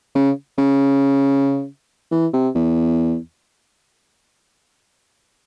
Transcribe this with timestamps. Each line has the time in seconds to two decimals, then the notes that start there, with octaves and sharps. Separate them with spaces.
0.15 C#3
0.58 C#3
2.11 E3
2.33 C3
2.55 E2